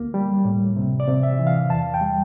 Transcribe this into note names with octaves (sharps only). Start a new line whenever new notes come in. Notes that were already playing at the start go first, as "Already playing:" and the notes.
Already playing: D2 A#3
G3
A2
C3
D5
C3
E5
E3
F5
E2 A5
G5
G3